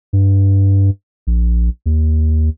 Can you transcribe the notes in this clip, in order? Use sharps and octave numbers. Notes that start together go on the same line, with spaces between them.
G2
A#1
D#2